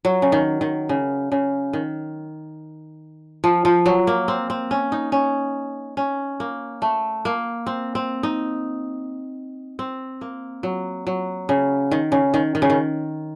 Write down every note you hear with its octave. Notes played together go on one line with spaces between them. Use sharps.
F#3
C#3
D#3
D#3
C#3
C#3
D#3
F3
F3
F#3
A#3
C4
C4
C#4
D#4
C#4
C#4
A#3
A3
A#3
C4
C4
D#4
C4
A#3
F#3
F#3
C#3
D#3
C#3
D#3
D#3
C#3
D#3